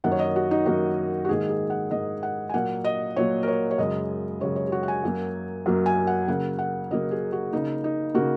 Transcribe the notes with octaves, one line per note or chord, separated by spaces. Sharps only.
F#2 D#3 A#3 F#5
C#5
D#5
F#4
D#4
F#2 D#3 A#3 F#4
F#4
G#2 D#3 A#3 G#4
G#4
F#5
G#2 D#3 A#3 D#5
F#5
G#5
A#2 F#3 A#3 F#5
D#5
A#2 F#3 A#3 C#5
A#4
C#5
C#5
F#2 C#3 G#3 D#5
F#2 C#3 G#3 C#5
C#5
G#4
F#4
F#5
G#5
F#2 F#3 A#3
F#2 F#3 A#3
G#5
F#5
C#3 F#3 A#3 F#5
F#5
C#3 F#3 A#3 D#5
G#4
F#4
C#3 A#3 D#4
D#4
C#3 A#3 F#4